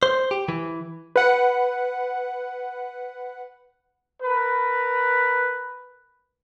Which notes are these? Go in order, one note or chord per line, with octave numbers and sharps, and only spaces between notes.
C5
G4
E3
B4 F#5
A#4 B4